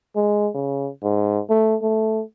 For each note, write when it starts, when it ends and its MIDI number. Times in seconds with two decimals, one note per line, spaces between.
0.16 0.49 56
0.54 0.89 49
1.03 1.40 44
1.50 1.75 57
1.82 2.22 57